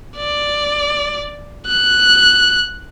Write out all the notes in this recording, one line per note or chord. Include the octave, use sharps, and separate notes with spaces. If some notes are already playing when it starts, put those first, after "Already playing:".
D5
F#6